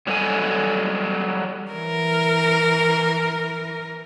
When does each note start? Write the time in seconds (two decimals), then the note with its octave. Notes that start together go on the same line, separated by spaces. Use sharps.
0.07 F#3 G3 A3 A4 D#5 G#5
1.72 E3 A#4